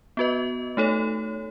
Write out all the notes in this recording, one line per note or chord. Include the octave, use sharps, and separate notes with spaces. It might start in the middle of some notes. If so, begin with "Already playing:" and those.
B3 F#4 B4 D#5
A3 D#4 A4 C#5